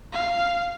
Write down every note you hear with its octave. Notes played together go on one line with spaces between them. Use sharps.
F5